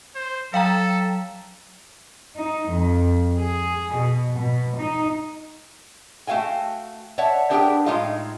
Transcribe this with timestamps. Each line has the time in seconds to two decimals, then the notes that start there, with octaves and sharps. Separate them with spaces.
0.16 C5
0.54 F#3 A4 F5 G5 A#5
2.37 D#4
2.70 F2
3.39 G#4
3.96 B2
4.39 B2
4.78 D#4
6.27 A3 F#4 F5 G5 G#5
7.18 C#5 D5 E5 F#5 A5
7.50 B3 D4 G4 G#4 A#4 G5
7.86 A2 G#3 D#4 F4 F5